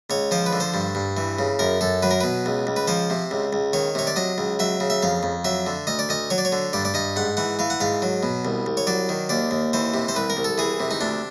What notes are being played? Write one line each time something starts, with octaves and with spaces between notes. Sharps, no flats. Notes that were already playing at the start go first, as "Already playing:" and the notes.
C#2 C#5
F3 C5
B4
D3
C5
G2
G2
E3
C#3
F#2 A#4
F#2 A4
F#3 B4
A#4
B2 B4
C#2
C#2
B4
F3 C5
C3
C#2
C#2
D#3 C#5
C3 C#5
D5
F#3 D#5
C#2
F#3 E5
C#3
E5
F2 F5
F2
F#3 E5
D3
D2 D#5
D5
D2 D#5
F#3 C#5
D5
C#5
D3
G2 D5
D5
G2 D#5
G#2 F#5
E3 F#5
E3 F5
F#5
G#2 F5
F#3
B2
C2
C2
C#5
F#3 D5
D#3
D#2 D5
D#2
E3 C5
C3
C5
C2 B4
A#4
C2
A4
E3 G#4
C3
D#4
D2 D4